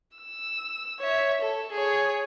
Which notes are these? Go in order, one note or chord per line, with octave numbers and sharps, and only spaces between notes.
E6
C#5 E5
A4
G#4 C#5